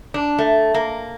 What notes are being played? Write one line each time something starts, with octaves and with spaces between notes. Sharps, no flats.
D4
A3
A#3